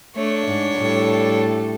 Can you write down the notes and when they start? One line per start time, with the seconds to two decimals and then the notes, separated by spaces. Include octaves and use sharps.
0.16 A3 D4 C#5
0.47 G#2
0.79 A2 G3 A4